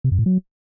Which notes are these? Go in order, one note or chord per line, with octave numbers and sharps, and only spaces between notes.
C3
F#2
A2
F#3